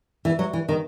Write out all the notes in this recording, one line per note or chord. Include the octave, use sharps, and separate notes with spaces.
E3
F#3
E3
D#3